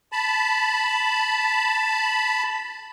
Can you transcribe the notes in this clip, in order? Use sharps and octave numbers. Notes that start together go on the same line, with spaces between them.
A5 B5